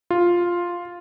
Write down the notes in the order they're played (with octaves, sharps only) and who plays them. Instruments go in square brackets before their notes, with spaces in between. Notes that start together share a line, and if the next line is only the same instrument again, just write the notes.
[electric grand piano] F4